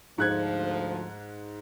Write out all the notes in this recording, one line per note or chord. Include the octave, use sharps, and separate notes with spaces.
D2 G#2 F3 F#6 G#6